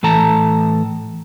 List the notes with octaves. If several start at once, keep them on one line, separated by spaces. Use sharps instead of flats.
A2 E3 A4 A5 A#5